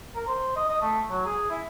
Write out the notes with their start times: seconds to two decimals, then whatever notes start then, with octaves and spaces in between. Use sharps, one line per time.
0.16 A#4
0.28 C5
0.56 D#5
0.69 D#5
0.81 A3
1.10 F#3
1.25 G#4
1.50 E4